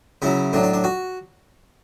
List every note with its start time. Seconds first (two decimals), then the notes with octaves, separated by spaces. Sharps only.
0.22 C#3 F#3 E4
0.53 A2 F#3 D4
0.63 D4
0.74 D4
0.84 F#4